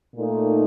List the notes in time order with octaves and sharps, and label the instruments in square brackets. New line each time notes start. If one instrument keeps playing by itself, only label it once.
[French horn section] A#2 A3 D#4